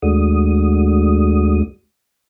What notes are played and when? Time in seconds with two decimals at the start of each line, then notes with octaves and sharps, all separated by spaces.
0.02 D#2 G#3 A3 D4 F#4 D#6